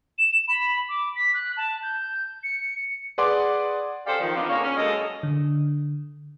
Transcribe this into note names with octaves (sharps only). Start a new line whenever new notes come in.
E7
B5
D6
B6
F#6
A5
G6
C#7
G#4 B4 D5 F#5 C6 D6
C#4 G4 A4 C5 D5 F5
D#3 F3
B3 C4 D4 D#4 F4 F5
C#3 A#3 C#5
C#4
F#2 G#3 A#3 A4 D#5
D3